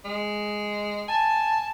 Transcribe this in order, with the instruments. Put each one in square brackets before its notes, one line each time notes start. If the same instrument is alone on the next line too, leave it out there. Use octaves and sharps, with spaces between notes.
[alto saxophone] G#3
[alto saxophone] G#5 [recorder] A5